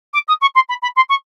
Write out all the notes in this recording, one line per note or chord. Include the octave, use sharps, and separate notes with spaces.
D6
D#6
C#6
C6
B5
B5
C6
C#6